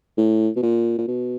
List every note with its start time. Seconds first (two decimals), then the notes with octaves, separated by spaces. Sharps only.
0.18 A2
0.56 B2
0.62 A#2
0.98 A#2
1.07 B2